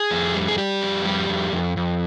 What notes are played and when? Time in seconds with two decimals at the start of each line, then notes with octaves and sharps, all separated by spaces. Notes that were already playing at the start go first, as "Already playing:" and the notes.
Already playing: G#4
0.11 F2
0.34 G3
0.48 G#4
0.58 G3 G4
0.82 F2
1.05 G3
1.29 F2
1.52 F2
1.77 F2